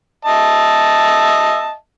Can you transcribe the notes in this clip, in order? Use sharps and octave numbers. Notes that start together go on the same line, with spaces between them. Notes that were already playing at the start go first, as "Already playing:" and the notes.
D#5 E5 A5